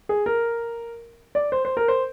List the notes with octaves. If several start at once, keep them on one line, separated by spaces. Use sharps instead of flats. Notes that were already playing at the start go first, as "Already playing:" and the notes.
G#4
A#4
D5
C5
C5
A#4
C5